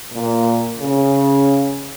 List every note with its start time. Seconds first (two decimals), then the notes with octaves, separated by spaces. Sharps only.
0.13 A#2
0.79 C#3